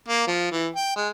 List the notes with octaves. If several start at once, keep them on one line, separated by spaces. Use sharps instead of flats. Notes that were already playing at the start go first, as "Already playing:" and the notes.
A#3
F3
E3
G5
G#3